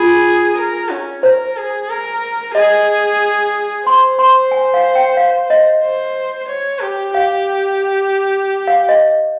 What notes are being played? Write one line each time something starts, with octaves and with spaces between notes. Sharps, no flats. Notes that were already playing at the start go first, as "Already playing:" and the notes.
Already playing: F4 G#4
A#4
C#4
A#4 C5
G#4
A#4
G#4 D#5
C5 C6
C6
G#5
F5
G5
F5
D#5
C5
C#5
G4
G4 F5
F5
D#5